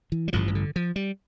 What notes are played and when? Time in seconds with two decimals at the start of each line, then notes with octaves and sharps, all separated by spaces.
0.12 E3
0.28 G3
0.33 A1 G2 D3 F3
0.48 E3
0.55 D3
0.76 F3
0.96 G3